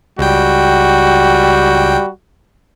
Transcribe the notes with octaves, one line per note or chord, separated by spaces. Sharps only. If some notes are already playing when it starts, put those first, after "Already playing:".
C#2 G3 F#4 G5